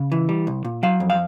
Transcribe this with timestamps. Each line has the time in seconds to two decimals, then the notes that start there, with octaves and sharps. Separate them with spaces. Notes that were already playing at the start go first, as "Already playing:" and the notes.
Already playing: C#3
0.12 E3
0.29 G3
0.47 C2
0.65 A#2
0.83 F#3 F5
1.00 F2
1.10 F5